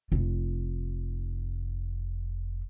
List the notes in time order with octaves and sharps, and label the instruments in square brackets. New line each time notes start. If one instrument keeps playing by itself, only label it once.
[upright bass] F1 F4